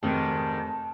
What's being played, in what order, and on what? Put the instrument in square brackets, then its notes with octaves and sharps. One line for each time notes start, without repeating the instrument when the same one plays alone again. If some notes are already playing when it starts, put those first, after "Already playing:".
[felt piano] F1 [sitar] G#2 D#3 [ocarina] A5